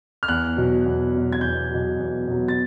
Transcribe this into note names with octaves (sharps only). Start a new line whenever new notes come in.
F6
E2 F#6
B2 F#3
E2
B2 F#3
G#6
E2 G6
B2 F#3
E2
B2 F#3
A6